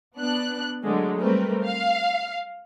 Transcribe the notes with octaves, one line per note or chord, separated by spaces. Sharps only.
B3 D4 F#6
D3 F#3 G#3 A3
G3 A3 C4 A#4 B4
F5